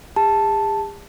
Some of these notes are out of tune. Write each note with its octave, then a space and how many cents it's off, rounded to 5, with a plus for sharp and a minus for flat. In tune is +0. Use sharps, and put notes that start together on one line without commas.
G#4 -45 A5 +0